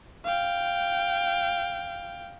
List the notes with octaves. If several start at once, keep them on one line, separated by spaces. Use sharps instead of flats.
F5 G5